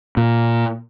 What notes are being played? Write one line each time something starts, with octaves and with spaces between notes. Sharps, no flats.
A#2